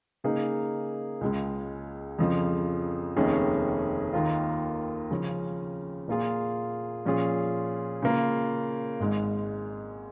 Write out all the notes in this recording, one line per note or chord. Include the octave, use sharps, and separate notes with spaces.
C#3 A#3 D#4 G#4
C#2 C#3 G#3
F2 C#3 F3
F1 D#2 D#3 C#4 G#4
D#2 D#3 A#3 F4
C#3 F3 C#4
A#2 A#3 F4 G#4
A#2 F3 C#4 F4 G#4
C#3 A#3 F4
G#1 G#2 G#3